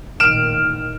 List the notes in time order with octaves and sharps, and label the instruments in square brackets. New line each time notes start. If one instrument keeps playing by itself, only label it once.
[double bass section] A1 A#2 D#3 [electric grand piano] F6 D7 E7